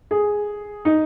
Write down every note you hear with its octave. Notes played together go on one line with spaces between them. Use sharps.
G#4
D#4